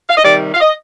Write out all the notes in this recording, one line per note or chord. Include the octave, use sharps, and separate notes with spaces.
F5
D#5
C3 D#3 G3 D5
F5
D#5